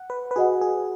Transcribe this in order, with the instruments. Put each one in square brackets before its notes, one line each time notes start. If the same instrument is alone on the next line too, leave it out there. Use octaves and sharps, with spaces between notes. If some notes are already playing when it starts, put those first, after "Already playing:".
Already playing: [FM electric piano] F#5
B4
B4
[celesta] F#4 D#5 F#5 [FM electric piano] G#4
[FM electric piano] G#4